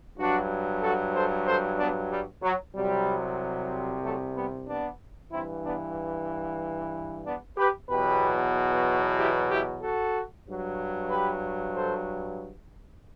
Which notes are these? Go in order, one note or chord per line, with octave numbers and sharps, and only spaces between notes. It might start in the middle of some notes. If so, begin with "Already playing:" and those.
G2 F#3 D4 F#4
F#4 A4
A4 C5
A4 C5
B3 D4
G3
F#3
C2 C3 F#3 G3
F#3 A3
G3 B3
B3 D4
G2 E3 C4 E4
B3 D4
B3 D4
G4 B4
E2 B2 F#3 G4 B4
E4 G4
E4 G4
F#4 A4
G2 F#3
G4 B4
A4 C5